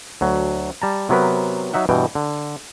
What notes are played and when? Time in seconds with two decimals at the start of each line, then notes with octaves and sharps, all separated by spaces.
0.21 D2 F#3
0.82 G3 A5 A#5
1.09 C3 F#3 B3 A#4 B4
1.74 F#3 D#4 E5 F#5
1.89 G2 B2 E3 G5
2.15 D3